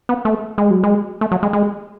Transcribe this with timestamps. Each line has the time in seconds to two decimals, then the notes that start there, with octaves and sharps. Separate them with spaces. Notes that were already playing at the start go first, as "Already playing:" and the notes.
0.09 B3
0.25 A3
0.58 G#3
0.70 F#3
0.83 G#3
1.21 A3
1.32 F#3
1.43 G#3
1.53 G#3